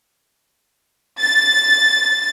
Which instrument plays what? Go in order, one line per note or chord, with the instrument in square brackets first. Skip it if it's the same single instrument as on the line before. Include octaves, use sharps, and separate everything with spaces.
[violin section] A6